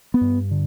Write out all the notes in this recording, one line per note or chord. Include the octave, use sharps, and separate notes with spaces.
B3
G2
D3